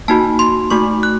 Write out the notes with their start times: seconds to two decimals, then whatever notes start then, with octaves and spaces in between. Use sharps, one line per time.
0.08 A#3 D#4 F#4 A5
0.39 C6
0.70 A3 D#4 F#4 C#6
1.03 F#6